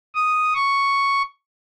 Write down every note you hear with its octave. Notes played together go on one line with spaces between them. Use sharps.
D#6
C#6